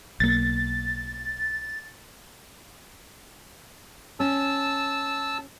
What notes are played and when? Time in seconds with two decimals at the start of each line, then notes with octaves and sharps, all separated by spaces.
0.20 B1 A#3 A6
4.20 C#4 A5 E6